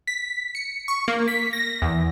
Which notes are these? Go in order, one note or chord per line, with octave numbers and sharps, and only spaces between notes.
B6
C#7
C#6
A#3
B6
A#6
E2